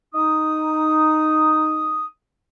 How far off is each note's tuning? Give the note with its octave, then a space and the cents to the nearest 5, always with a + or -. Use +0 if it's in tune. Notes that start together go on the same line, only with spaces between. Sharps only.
D#4 -5 D#6 +0